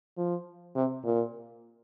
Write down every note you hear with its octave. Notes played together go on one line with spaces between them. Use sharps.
F3
C3
A#2